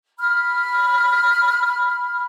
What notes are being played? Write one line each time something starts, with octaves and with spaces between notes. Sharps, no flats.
B5 F6